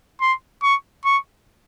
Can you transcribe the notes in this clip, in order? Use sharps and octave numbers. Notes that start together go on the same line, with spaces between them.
C6
C#6
C#6